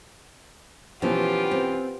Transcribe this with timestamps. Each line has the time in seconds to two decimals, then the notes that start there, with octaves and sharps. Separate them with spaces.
1.02 B2 E3 F3 B3 C#4 F4 G4
1.51 C4